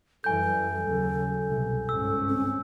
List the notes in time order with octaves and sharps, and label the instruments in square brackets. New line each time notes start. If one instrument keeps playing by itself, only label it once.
[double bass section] F#2 E3 G3 [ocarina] A4 [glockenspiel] G#5 G6
[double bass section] D#2 C#3 F#3
C2 F#2 B2
[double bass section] G1 G#2 C#4 [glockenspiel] E6
[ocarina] C4